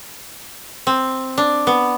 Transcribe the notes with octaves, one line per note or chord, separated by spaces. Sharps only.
C4
D4
B3